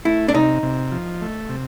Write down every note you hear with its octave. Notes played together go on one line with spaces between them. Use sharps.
A3 E4
D4
C3 D#4
C3
F3
A3
C3